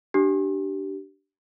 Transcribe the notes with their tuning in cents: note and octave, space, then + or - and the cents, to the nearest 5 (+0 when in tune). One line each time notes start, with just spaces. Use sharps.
D4 +5 G4 -25